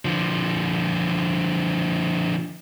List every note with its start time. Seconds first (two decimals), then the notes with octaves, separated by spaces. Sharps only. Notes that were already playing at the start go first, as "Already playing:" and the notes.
0.05 D3 F3